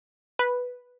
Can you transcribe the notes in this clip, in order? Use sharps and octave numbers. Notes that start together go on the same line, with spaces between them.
B4